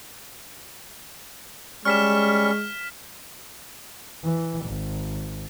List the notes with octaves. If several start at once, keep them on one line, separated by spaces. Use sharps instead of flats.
G3 G#3 C#4 C#6 F6 B6 E7
E3
G#1